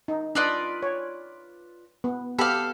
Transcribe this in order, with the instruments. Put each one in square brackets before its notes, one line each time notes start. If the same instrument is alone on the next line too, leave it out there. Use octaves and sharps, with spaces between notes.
[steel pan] D#4
[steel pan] D4 D#5 [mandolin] F4 B4 D5
[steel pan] C#5
B3
[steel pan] B3 G4 B5 [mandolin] A4 F5